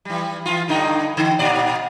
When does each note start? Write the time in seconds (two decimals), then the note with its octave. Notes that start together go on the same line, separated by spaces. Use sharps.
0.05 E3 G3
0.46 E3 F4
0.68 G2 D3 D#4
1.17 D3
1.39 A#2 D5